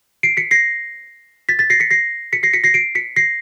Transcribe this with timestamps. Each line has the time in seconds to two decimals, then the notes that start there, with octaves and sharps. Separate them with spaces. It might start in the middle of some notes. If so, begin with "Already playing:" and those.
0.23 C7 D7
0.37 B6 C#7
0.51 A#6 C7
1.49 A6 B6
1.59 A6 B6
1.70 A#6 C7
1.80 B6 C#7
1.91 A#6 C7
2.33 B6 C#7
2.43 A#6 C7
2.53 B6 C#7
2.64 A#6 C7
2.74 C7 D7
2.95 B6 C#7
3.16 A#6 C7